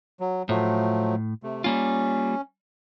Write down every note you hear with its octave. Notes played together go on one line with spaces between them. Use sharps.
F#3
A2 F3 F#3 A3
C3 A3
G3 A#3 C#4 F4